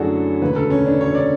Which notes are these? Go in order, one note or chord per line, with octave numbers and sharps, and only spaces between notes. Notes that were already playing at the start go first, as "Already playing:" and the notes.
Already playing: F#2 D3 A3 D4 E4 F#4 G#4 A4
E1 D2 C#3 B4
A4
C#4
D4
C#5
D5